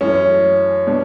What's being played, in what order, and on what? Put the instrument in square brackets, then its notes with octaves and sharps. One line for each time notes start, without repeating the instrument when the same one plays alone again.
[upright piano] F#2 E3 A3 [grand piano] C#4
[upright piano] B2 G3 D4